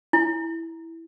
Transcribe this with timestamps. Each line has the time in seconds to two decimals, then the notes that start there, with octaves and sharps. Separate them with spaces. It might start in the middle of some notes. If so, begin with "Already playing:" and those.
0.13 E4